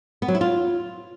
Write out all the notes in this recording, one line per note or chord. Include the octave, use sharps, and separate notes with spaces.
B3
F#3
E4
F4